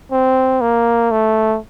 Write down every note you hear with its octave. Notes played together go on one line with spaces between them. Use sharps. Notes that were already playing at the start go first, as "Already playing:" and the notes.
C4
A#3
A3